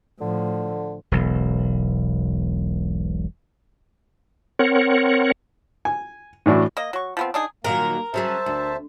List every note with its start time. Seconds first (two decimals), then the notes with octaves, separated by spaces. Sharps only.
0.21 A2 D3 F3
1.11 E1 B1
4.59 C4 A#4 C#5 F#5
5.85 G#5
6.46 A2 E3 D4 E4 F#4
6.77 A#3 D#5
6.93 F#3 C#6
7.17 F3 B3 C4
7.34 D4 D#4 G#4
7.64 A#2 D#3 F#3 A#3 A#4
8.14 C#3 F#3 G#4 C5 E5 A5
8.46 D2